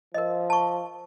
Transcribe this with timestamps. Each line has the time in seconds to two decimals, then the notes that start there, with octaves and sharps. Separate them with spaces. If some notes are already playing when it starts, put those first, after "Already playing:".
0.14 F3 A#4 D#5
0.50 A5 C#6